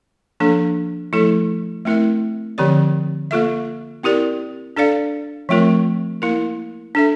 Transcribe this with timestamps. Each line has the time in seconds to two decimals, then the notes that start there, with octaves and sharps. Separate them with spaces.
0.40 F3 A#3 D4 A4
1.13 F3 A3 E4 A4
1.85 A3 C4 E4 A#4 E5
2.58 D3 F3 C4 G4 D5
3.31 A#3 F4 A4 E5
4.03 C4 E4 G4 A#4 D5
4.76 D4 A4 D5 F5
5.49 F3 A3 C4 F4 A#4
6.22 A#3 E4 A#4
6.95 D4 A4 E5